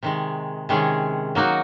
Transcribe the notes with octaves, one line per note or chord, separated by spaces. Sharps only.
C3 D#3 G#3
C3 D#3 G#3 C#4 G#4
F#3 A#3 D#4 F#4